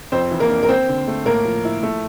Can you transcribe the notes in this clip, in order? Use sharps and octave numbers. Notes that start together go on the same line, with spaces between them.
F2 C4 C5
E3
A#3 A#4
D4
A#4
C4 C5
D3
A3
A2 A#3 A#4
F3
E4
A3